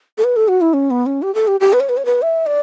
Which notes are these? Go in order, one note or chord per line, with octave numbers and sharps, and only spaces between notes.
A4
B4
A4
F#4
E4
C#4
B3
C#4
G4
A4
G4
G4
B4
C#5
B4
C#5
B4
E5
D5